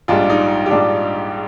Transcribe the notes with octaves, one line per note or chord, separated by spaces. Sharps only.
A#1 G#2 G3 D4 F4
D#4
G4
A#1 G#2 G3 D4 F4